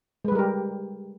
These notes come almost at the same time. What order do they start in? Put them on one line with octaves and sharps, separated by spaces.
G#3 B4 G3 A#4 G4